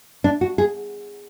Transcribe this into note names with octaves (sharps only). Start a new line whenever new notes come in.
D4
F#4
G#4